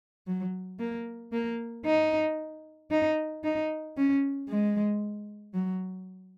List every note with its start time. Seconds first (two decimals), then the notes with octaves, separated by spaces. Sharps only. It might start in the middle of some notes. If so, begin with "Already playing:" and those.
0.27 F#3
0.80 A#3
1.32 A#3
1.85 D#4
2.91 D#4
3.44 D#4
3.97 C#4
4.49 G#3
5.54 F#3